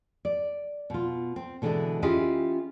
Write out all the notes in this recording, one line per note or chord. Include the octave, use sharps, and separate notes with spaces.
D5
B2 F4
C4
B2 D3 E3 G#3 D4
C#4 E4 F4 G4 G#4 D#5